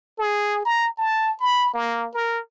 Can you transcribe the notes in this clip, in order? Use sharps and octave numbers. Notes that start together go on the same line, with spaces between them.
G#4
A#5
A5
B5
A#3
A#4